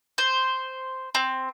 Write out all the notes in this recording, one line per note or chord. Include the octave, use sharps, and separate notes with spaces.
C5
C4